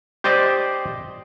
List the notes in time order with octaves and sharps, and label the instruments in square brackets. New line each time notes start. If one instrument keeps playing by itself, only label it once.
[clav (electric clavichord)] G4 C5 D5 D#5